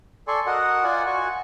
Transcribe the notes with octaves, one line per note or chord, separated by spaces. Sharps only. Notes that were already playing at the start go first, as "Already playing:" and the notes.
A4 D5 G#5 C6 C#6
F#4 A#4 D#5 F#5
F4 D5 F#5 G#5
F#4 G#5 C#6